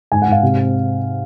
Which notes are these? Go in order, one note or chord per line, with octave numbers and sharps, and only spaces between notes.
G#2 G#5
F#5
G#2 F5
C3
C4